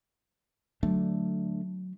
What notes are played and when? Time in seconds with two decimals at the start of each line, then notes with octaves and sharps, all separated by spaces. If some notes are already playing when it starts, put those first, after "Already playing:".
0.83 D3 F#3 A3 D4